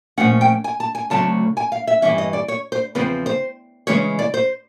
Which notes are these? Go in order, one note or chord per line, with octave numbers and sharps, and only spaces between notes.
A#2 F3 A3 C#4 F#5
G5
G#5
A5
G#5
D2 C#3 F#3 A3 C4 A5
G#5
F5
E5
G2 E3 G3 A#3 C#4 E5
D#5
D5
C#5
C5
E2 C#3 F3 C4 B4
C5
C#3 E3 G#3 C#4 C#5
D5
C5